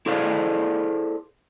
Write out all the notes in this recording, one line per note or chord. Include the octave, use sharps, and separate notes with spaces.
E4 G#4 A4 C5 D5 F5